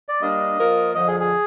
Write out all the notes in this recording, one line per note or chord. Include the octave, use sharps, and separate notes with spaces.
D5
G3 A#3 D4 D#5
F3 A#3 F4 A#4
F2 D3 F3 D#5
G#4
G#4